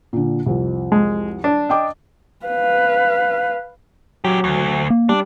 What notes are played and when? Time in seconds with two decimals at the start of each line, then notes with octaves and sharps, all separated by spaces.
0.13 A#2 D3
0.46 C2 F2
0.92 G#3
1.44 D4
1.69 D#5 G5 D6
2.46 B4 F5
4.24 F#3 C#4 G4
4.44 D2
4.90 A#3
5.09 G3 D4